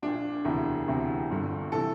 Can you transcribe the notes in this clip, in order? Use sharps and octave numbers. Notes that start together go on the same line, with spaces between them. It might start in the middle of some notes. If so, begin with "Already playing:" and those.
A#1 A#2 D4
E1 D2 C3 E3
E1 D2 C3 E3
G1 G2 D3
C3 E3 A4